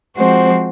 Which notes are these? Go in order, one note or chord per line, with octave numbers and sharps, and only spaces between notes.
F3 G#3 C4 F#4 C5